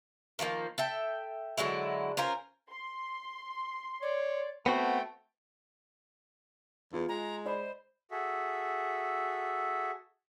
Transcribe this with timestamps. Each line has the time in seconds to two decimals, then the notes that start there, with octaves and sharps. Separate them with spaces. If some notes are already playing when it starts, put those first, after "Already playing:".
0.39 D#3 F3 G3 A#3
0.78 A4 E5 G5
1.57 D3 F#3 G#3 E4
2.17 C#4 F4 A#4 C5
2.71 C6
4.02 C#5 D5
4.66 A3 B3 C4 F#4 G5
6.93 E2 F4
7.09 G#3 A#5
7.46 C5 D5 D#5 B5
8.11 F#4 G#4 A4 E5